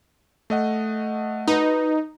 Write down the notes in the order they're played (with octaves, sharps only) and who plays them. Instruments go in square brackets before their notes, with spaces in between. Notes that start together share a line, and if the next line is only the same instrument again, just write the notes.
[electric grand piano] A3 D#5 F#5
[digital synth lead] D#4 [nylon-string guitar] F#4 B4